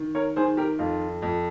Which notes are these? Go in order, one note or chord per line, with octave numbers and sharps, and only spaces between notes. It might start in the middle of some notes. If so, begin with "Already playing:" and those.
Already playing: D#3
A#4 C#5
D#3 G#4 C5
G4 A#4
F2 F4
F2